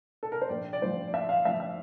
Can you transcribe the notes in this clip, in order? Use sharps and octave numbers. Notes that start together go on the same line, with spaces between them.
A4
A#4
C5
A#1 D5
D5
A2 F3 C5
D5
A#1 E5
F5
A2 F3 E5
E5